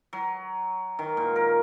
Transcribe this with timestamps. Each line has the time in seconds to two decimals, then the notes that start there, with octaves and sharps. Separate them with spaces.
0.13 F#3
0.99 D#3
1.17 A#2
1.36 A#4